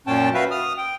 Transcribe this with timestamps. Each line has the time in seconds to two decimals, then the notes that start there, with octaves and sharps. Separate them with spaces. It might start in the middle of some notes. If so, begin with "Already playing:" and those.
0.07 F#2 A#2 C#4 G5 A5
0.34 F#4 B4 E5 F5
0.51 D#6 F6
0.78 G5